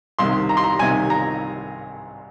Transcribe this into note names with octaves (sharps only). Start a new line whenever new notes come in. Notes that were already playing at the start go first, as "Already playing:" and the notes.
C2 C3 D#3 C6
A#5
C6
A#5
C2 C3 D#3 G#5
A#5